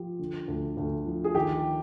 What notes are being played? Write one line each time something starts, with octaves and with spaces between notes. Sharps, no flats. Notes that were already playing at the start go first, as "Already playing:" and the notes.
Already playing: F3 G4
D3
D2
D2
F3
G#4
D#3 G4